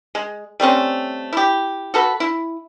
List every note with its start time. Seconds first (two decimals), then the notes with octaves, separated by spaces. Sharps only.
0.15 G#3
0.60 G3 A3 C4 C#4
1.33 E4 G4
1.94 F#4 A4 B4
2.20 E4